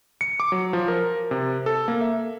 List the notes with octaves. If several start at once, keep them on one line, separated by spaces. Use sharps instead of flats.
C#7
D6
F#3
F3
A#4
C3
A4
A#3
E5